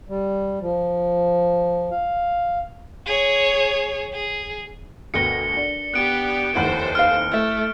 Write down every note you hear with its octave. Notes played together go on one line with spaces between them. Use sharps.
G3
F3
F5
G#4 C#5
G#4
D2 B2 A#4 B4 G5 A#6 C#7 G7
D4
B3 G4 F#6 D7
F1 D#2 E4 A4 C5 C#5 F#5 B5
B4 F5 F6
A3 E4 E5